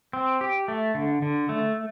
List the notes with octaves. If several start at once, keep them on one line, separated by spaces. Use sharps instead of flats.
C4
G4
A3
D3
D3
A3